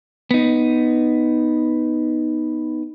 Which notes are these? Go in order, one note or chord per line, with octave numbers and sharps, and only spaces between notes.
B3 D#4